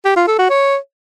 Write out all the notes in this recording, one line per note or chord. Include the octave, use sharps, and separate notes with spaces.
G4
F4
A4
F#4
C#5